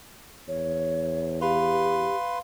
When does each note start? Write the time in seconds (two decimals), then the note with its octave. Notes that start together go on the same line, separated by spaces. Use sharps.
0.48 E2 C#5
1.41 G4 B4 F5 C6